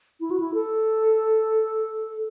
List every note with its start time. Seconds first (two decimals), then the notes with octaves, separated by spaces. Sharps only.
0.20 E4
0.31 F#4
0.40 E4
0.54 A4